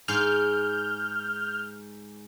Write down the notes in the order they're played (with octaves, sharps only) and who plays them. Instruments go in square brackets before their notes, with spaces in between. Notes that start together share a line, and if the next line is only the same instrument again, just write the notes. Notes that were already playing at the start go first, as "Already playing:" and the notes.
[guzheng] G#2 [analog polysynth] F6 G6